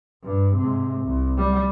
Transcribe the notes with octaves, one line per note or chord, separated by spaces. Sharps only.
G2
G#2 C3
C2
G3